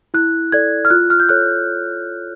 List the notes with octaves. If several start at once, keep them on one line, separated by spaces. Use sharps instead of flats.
E4 F#6
A4 D5 G#6
F6
F4 F#6
F6
G6
A4 C#5 F#6